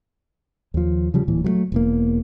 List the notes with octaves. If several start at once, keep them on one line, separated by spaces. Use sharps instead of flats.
D#2 F3
C#3 F3 G3
D1 A#2 E3
F#3 G3 A3
E1 E2 A#3